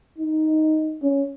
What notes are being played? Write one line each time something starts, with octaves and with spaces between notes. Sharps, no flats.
D#4
C#4